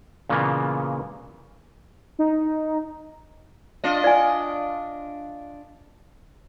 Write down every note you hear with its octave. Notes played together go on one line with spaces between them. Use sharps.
A#2 C#3 E3 G#3 A#3 B3
D#4
D4 F4 D#5
D5 G#5